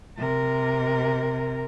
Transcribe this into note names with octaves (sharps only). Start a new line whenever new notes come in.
C3 A#4